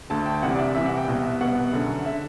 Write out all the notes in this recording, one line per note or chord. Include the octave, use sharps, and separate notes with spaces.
D2 D3 A5
G5
C2 C3 E3 F#5
D5
E5
C2 C3 E3 E5
F#5
G5
C2 B2
E5
C2 B2 F#5
F#2 D3
D3 E5